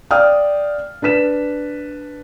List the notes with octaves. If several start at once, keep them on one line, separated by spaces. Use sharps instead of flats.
D5 F5 G5 D#6 F6
D4 B4 B6 E7